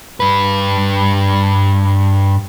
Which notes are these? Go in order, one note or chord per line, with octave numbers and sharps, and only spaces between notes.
G2 B4